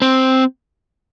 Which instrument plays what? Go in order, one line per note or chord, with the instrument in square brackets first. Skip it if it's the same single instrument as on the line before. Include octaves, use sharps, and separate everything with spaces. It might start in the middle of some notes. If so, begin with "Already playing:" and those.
[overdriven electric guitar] C4